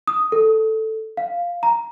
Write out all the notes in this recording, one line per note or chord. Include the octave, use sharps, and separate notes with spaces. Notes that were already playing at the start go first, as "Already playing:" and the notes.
D#6
A4
F5
A#5